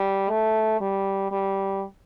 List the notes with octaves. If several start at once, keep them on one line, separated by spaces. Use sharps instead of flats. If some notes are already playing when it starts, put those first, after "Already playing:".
Already playing: G3
A3
G3
G3